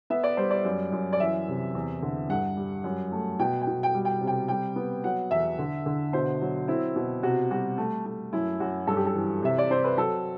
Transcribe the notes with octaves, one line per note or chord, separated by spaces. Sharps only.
B3 E5
D5
G3 C5
D5
F#2
F#2
D5
E3 E5
C3
E2
D3
G2 F#5
G3
F#2
A3
B2 G5
G5
B2
G5
G3
G5
C3
G5
G3 G5
B3
F#3 F#5
E2 E5
D3
D3
B2 C5
F#3
C4 E4
B2
C3 F#4
G3 F#4
A3
A3
F#2 E4
F#2 F#4
G2 A4
G4
A4
E3
C3 E5
D5
C4 C5
B4
F#3 A4